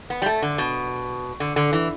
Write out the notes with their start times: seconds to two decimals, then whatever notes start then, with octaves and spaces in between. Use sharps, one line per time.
0.10 B3
0.22 G3
0.26 A3
0.42 D3
0.58 B2
1.40 D3
1.56 D3
1.73 E3